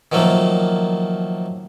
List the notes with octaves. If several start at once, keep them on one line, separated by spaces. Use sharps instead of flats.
D#3 F3 F#3 A3 A#3